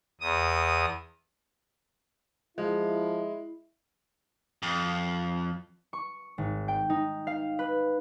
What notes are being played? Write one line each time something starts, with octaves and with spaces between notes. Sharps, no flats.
E2 D#6
F3 G#3 E4
F2
C#6
G#1
G5
D#4
F5
B4